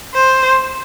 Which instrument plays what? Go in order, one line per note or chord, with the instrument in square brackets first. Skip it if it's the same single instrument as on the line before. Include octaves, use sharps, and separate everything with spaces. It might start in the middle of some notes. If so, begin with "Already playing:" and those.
[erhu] C5